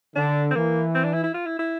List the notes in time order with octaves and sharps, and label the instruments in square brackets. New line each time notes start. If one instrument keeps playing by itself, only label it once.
[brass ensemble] D3 [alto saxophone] D4
[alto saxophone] C4
[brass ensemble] E3 [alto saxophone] A#3
[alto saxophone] C4
D4
E4
E4
F4
E4
E4